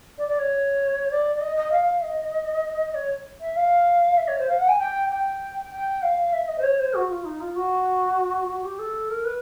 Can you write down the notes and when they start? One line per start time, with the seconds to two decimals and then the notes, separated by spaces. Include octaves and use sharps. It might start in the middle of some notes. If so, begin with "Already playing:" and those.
0.18 D5
0.28 D5
0.39 C#5
1.10 D5
1.35 D5
1.41 D#5
1.56 D#5
1.72 F5
2.03 D#5
2.95 C#5
3.40 E5
3.56 F5
4.17 E5
4.28 C#5
4.38 C5
4.49 F5
4.59 F#5
4.68 G#5
4.79 G5
5.09 G5
5.71 G5
6.02 F5
6.33 E5
6.48 D#5
6.58 C5
6.63 C#5
6.79 C5
6.94 F#4
7.10 F4
7.24 D#4
7.40 F4
7.56 F#4
8.48 F#4
8.63 G4
8.79 A4
9.10 A#4
9.25 B4